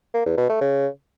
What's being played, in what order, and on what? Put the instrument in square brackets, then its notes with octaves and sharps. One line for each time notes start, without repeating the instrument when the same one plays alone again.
[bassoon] A#3
E2
B2
A3
C#3